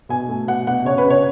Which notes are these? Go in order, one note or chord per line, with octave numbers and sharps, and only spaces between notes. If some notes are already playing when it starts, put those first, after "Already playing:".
B2 G#5
A3
B2 F#5
B2 F#5
C#3 C#5
B4
C#3
C#5